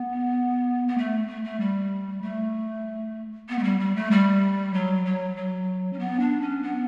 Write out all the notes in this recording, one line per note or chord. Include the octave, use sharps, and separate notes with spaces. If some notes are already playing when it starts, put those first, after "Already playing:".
Already playing: B3
B3
A3
A3
A3
G3
A3
B3
A3
G3
G3
A3
G3
F#3
F#3
F#3
C#4
B3
D4
C#4
B3